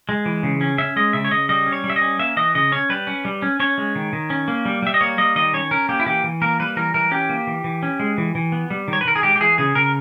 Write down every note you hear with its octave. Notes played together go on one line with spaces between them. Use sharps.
G#3
E3
C#3
C#4
C#4 E5
G#3 D#5
C#3 E5
C#5
C#3 D#5
G3 D#5
C#4
C#5
G3
E5
D#5
C#4
A#3 E5
E3 D#5
C#3 D#5
C#4 C#5
G3 B4
C#4
G3
C#4
C#4 C#5
G#3
D#3
D#3
C#4
A#3
G3
G3 E5
D#5
A#3 C#5
G3 D#5
D#3 D#5
C#4 C#5
C#4 A#4
A#3 G4
E4
E3 G4
E3
A#3 A#4
G3 B4
E3 A#4
E3 A#4
C#4 G4
A#3
E3
E3
C#4
G#3
E3
E3
B3
G3
D#3
C#5
B4
D#3 A#4
G#4
G#3 G4
G4
E3 G#4
C#3 G#4
C#3 A#4